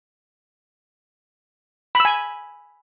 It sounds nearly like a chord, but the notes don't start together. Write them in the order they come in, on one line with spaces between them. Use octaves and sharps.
B5 E6 G#5